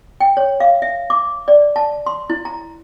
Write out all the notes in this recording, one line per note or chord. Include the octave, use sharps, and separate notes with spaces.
G5
C#5
F5
E5
D6
D5
A5
C6
E4
A#5